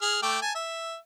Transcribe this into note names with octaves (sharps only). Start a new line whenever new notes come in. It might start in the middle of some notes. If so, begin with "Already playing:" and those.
G#4 F6
A3 G5 D6
G#5 A5
E5